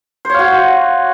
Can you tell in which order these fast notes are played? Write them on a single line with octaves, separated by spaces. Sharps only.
C5 C#5 F5 F#4